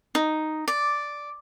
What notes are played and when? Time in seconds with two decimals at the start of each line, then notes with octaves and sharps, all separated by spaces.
0.15 D#4
0.68 D5